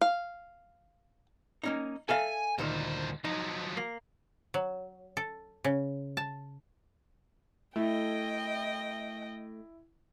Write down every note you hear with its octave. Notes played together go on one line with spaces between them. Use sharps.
F5
A#3 C#4 D#4
A4 E5 F5 G#5
D2 G2 A#2 D#3 C5
F3 F#3 D#4
A#3
F#3
A4
C#3
A5
A3 E4 D#5 G5